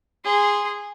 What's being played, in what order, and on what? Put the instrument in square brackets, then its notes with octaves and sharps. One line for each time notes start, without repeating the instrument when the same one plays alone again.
[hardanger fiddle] G#4 C6